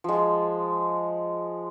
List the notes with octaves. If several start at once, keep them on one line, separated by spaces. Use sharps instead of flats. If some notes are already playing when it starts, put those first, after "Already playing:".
F3 G#3